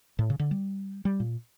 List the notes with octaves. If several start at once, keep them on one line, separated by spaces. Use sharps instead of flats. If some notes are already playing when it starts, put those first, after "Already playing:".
A2
C#3
D3
G3
G3
A#2